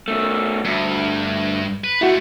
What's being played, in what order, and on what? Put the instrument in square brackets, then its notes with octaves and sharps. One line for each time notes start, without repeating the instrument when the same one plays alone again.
[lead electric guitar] D#3 A3
[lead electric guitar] D2 [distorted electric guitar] G2
[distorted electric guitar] B4
[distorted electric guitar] G#3 A3 [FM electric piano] E4 F#4